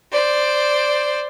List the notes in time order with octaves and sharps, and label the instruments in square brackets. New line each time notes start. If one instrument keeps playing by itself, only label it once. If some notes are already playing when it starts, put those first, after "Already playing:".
[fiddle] C5 D5